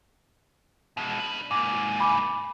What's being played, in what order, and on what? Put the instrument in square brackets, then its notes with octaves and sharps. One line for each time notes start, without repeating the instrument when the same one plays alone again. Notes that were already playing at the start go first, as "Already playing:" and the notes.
[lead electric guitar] B2 G#3
D4 B4
[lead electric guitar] G#2 A#3 [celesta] D6
[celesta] G#5 B5 D6